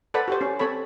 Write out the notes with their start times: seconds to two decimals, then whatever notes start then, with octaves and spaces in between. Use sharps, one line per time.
0.14 A4 B4 C5 D5 F#5 B5
0.28 F#4 G4 C5
0.41 C#4
0.59 C4 A4 C#5 B5